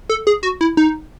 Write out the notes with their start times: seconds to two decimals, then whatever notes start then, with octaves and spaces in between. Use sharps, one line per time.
0.09 A4
0.27 G#4
0.43 F#4
0.61 E4
0.77 D#4